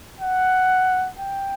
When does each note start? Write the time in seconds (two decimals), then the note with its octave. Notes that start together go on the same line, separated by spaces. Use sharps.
0.20 F#5
1.19 G5